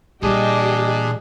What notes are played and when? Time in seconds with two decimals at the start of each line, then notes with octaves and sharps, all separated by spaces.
0.23 A#2 E3 G3 D4 G4 G#4 D#5 G5